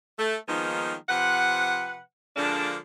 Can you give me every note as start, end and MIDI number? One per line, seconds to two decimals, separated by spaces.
0.19 0.36 57
0.47 0.94 51
0.47 0.94 53
0.47 0.94 56
0.47 0.94 58
0.47 0.94 59
0.47 0.94 63
1.09 2.00 48
1.09 2.00 53
1.09 2.00 71
1.09 2.00 78
2.36 2.77 50
2.36 2.77 53
2.36 2.77 56
2.36 2.77 58
2.36 2.77 62